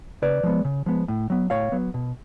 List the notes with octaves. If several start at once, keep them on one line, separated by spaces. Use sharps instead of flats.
C#3 B4 D5
F3 G#3 B3
C#3
F3 G#3 B3
A2
F#3 B3
A2 C#5 F5
F#3 B3
B2